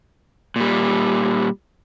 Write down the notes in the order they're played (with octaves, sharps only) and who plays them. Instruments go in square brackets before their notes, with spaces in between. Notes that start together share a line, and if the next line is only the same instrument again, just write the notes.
[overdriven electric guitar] A#2 G3